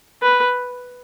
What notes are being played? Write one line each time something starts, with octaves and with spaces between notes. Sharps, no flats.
B4